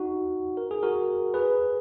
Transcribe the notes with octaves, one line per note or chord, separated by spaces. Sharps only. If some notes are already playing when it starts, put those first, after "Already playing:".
Already playing: D#4 F#4
A#4
G#4
F#4 A#4
G#4 B4